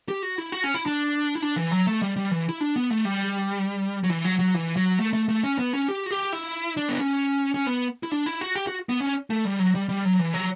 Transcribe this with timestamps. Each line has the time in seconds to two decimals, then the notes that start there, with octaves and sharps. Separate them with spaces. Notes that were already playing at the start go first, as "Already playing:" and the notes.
0.09 G4
0.23 F#4
0.38 E4
0.52 F#4
0.64 C#4
0.74 E4
0.86 D4
1.35 E4
1.42 D4
1.56 E3
1.71 F#3
1.87 A3
2.02 G3
2.16 G3
2.31 E3
2.49 E4
2.60 D4
2.76 B3
2.90 A3
3.05 G3
4.04 F#3
4.10 E3
4.25 F#3
4.39 F#3
4.54 E3
4.76 F#3
4.99 A3
5.13 A3
5.29 A3
5.43 C#4
5.59 B3
5.73 C#4
5.88 G4
6.06 F#4
6.11 G4
6.33 E4
6.77 D4
6.89 B3
7.00 C#4
7.54 C#4
7.67 B3
8.03 E4
8.12 D4
8.26 E4
8.41 F#4
8.55 G4
8.67 F#4
8.89 B3
9.00 C#4
9.30 A3
9.45 G3
9.59 F#3
9.75 G3
9.89 G3
10.05 F#3
10.19 E3
10.34 F#3